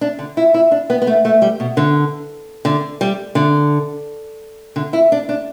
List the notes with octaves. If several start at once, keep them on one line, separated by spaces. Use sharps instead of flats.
D4
D3
E4
E4
D4
B3
B3
A3
A3
G3
B2
D3
D3
G3
D3
D3
E4
D4
D4